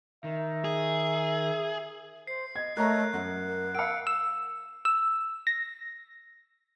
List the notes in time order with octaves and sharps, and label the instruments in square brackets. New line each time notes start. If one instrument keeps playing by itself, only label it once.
[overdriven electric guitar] D#3 [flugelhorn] E5
[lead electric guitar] G#4
[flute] C5 [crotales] C7
[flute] D#5 [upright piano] G#6
[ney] A3 [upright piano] A#4 C#5 A#5 [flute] D#5 [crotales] F#6
[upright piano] F#2 [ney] A#4 [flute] F#5
[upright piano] F5 F#5 [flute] E6 [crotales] C#7 D7
[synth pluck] E6
E6
A#6